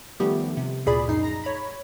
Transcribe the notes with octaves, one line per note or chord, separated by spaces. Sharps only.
D#3 F3 G3 A3 B3 G4
C3
D2 A#2 G#4 D5 B5
A#1 F#2 D#4 C7
A#5 A#6
C#5 B5